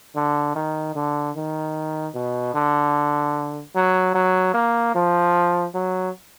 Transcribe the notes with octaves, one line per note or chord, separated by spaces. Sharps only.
D3
D#3
D3
D#3
B2
D3
F#3
F#3
A#3
F3
F#3